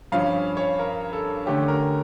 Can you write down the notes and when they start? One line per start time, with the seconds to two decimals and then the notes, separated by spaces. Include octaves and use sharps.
0.12 G2 F3 C#4 F5
0.57 C#5
0.79 A#4
1.13 A4
1.46 D3 A3 C#4 G4
1.68 A#4